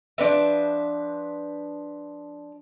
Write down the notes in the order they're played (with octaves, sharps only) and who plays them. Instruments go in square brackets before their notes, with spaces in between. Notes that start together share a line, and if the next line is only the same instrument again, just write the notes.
[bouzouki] F3 D4 B4 E5